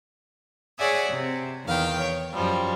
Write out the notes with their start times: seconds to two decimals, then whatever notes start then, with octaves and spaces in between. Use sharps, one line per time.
0.78 G#4 C#5 D5 E5 F#5 G#5
1.09 C3
1.64 E2 D#3 F5 G5
2.00 C#5
2.33 F#2 F3 G3